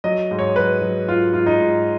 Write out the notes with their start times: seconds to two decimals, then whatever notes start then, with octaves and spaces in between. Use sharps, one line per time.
0.04 F#3 D#5
0.31 G#2
0.39 C#5
0.56 F#3 B4
0.82 F#3
1.08 G#2 F4
1.34 G#2 F4
1.46 D#4
1.60 G#2